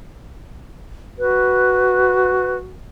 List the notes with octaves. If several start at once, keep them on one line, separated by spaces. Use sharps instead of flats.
F#4 B4